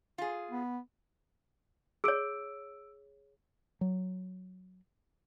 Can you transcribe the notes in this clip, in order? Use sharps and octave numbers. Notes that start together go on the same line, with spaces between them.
F4 G#4
B3
G#4 C#5 E6 D7
F#3